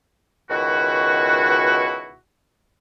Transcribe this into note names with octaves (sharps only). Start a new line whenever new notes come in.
C#2 B2 D#3 E4 F#4